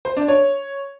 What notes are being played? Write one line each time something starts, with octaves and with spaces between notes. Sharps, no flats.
C5
D4
C#5